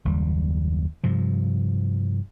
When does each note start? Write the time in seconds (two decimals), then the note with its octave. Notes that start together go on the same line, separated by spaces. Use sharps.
0.05 F#1 D#2 G3
1.04 G2 C3 F3